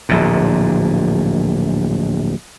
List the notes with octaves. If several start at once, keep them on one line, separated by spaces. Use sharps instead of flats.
D1 A#1 A#2